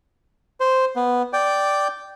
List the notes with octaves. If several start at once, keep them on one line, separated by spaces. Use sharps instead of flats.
C5
B3
D5 G5